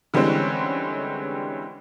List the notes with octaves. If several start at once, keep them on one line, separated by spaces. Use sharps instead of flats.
D3 E3 G3 G#3 C4 C#4